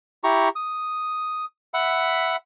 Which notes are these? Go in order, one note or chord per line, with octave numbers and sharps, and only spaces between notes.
E4 G4 A#5 C#6
D#6
E5 F#5 B5